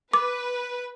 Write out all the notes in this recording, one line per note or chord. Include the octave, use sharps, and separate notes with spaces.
B4 D6